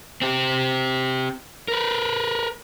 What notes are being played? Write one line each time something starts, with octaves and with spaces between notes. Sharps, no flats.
C4 G4
A#4 B4